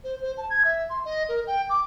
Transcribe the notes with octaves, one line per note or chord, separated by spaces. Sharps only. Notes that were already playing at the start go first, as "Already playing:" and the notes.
C5
C5
A5
G#6
E5
C6
D#5
A#4
G5
D6